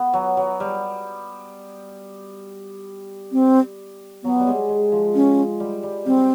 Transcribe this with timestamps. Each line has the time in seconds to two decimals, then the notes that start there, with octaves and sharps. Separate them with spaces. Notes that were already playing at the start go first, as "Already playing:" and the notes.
Already playing: B3
0.14 F#3
0.37 F#3
0.60 G3
3.32 C4
4.23 F#3 B3
4.40 G3
4.47 G#3
4.69 G#3
4.92 F3
5.15 C#4
5.60 G3
5.83 G3
6.06 G3 C4